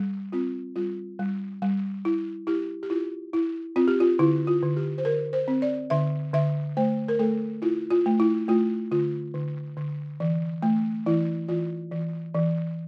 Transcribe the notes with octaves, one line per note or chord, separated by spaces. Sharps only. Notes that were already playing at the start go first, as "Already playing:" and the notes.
Already playing: G3
C4 F4
G3 F4
G3
G3
E4
E4 G4
G4
E4 F4
E4
C4 F4
G4
F4
D3 E4
F4
D3
G4
C5
D3 A#4
C5
C4
D5
D3 E5
D3 E5
A3 C5
A#4
A3 A4
E4 F4
F4
A3
E4
A3 F4
D3 F4
D3
D3
E3
A3
E3 E4
E3 F4
E3
E3